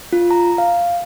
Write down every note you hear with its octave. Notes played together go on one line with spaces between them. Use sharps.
F4
A#5
F5